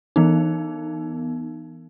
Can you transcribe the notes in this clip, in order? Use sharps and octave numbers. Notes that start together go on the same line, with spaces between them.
E3 B3 D#4